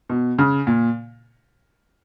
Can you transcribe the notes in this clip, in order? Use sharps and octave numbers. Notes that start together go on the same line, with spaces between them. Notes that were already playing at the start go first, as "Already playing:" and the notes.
B2
C#3
A#2